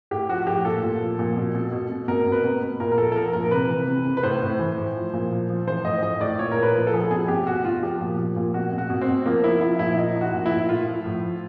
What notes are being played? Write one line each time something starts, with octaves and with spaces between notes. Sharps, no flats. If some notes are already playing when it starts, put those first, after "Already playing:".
A2 G4
F3 F#4
F#4
A2 G4
A#2 A4
A#2
F3
A#2
B2
B2
B2
B2
B2 A#4
B2
B4
B2
B2
A#2 A#4
A#4
F3 A4
A4
F3 A#4
A#2 A#4
A#4
C3 B4
E3
C3
C3
B4
A2 C5
A2
E3
A2
F3
A#2
F3
F3
E3 C5
A2 D#5
A2 D#5
A2 D5
A#2 C#5
A#2 A#4
B4
F3
A4
F3 G#4
A4
B2 G#4
B2 G4
B2 F#4
B2 F4
F3 G4
A#2
F3
A#2
B2 F#4
B2
F#4
B2
C4
B2
F3 A#3
F3 E4
F3 E4
A#2 E4
F3 D#4
F3
F#4
A#2
E4
A#2
A2 F4
F3
A2
F3